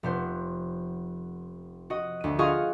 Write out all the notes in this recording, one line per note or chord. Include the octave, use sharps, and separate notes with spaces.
F1 B3 C5
F#4 D#5
D2 D#7
F4 F#4 G#4 D#5 F5 C#6